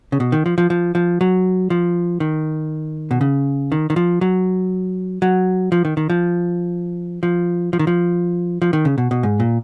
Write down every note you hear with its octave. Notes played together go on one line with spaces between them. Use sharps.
C#3
B2
D#3
F3
F3
F3
F3
F#3
F3
D#3
B2
C#3
D#3
D#3
F3
F#3
F#3
F3
D#3
D#3
F3
F3
F3
D#3
F3
F3
D#3
C#3
B2
B2
G#2
A#2